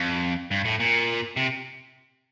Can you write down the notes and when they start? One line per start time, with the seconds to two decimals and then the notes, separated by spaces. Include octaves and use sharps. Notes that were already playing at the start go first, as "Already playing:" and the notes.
Already playing: F2
0.51 G2
0.65 A2
0.80 A#2
1.36 C3